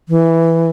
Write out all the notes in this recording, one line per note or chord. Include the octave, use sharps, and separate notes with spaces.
E3